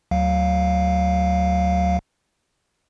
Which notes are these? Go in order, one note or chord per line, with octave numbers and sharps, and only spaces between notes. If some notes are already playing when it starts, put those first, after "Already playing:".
D2 F#3 F5